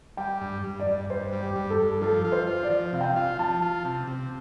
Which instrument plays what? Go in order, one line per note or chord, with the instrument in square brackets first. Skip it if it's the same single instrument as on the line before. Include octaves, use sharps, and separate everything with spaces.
[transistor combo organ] G3 [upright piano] G5
[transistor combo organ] G2
G2
[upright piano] D5
[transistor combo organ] G2
[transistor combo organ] G2 [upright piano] C5
[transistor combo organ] G3
[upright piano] G4
[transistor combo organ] G2
[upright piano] A4
[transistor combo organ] G2
[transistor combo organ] F3 [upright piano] A4
[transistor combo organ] F4
[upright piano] C5
[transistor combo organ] F4
[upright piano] D5
[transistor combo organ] F3
[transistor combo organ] C3 [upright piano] F5
[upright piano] G5
F5
[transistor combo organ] F4
[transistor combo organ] F3 [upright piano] A5
[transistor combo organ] F4
C3
C3